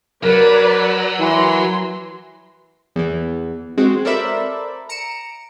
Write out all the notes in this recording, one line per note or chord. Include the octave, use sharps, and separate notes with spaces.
F#3 A#4 B4 D5
E3 C6
E2 E3
G#3 C4 F#4
A4 A#4 C5 D5 E5 B5
A#5 C#7 D7 E7